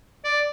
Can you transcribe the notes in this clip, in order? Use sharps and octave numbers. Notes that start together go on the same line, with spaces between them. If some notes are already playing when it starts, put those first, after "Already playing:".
D5